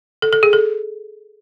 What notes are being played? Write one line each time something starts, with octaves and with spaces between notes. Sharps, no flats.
A4
A4
G#4
A4